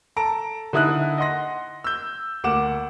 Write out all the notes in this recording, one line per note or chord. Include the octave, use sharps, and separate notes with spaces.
A4 A5 A#5 D7
D3 D#4 E4 D#6 F#6
D#5 F#5 C6 A#6
E6 G6
D2 A#3 F#5 D6 E7